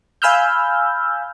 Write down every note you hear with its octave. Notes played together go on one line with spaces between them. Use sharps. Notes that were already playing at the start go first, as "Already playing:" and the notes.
F5 G#5 B5 E6 F6 G6